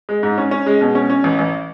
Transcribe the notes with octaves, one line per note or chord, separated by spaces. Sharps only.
G#3
G#2
C#4
C#4
G#3
B2
C#4
C#4
A1
A1